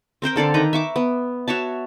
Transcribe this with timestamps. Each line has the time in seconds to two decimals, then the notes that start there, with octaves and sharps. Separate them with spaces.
0.22 C4 A#4 C5 G5
0.36 D3 A4 D5 F5
0.54 D#3 B4 A#5
0.73 E5 C#6 D6
0.96 B3
1.48 F#4 C#5 E5 A5